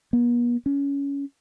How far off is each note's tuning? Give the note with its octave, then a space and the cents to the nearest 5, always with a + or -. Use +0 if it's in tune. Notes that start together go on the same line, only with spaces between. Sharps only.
B3 -45
C#4 +20